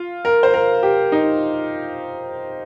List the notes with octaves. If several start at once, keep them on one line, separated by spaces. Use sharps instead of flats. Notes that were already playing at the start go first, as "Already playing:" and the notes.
Already playing: F4
A#4
C5
A#4
G4
D#4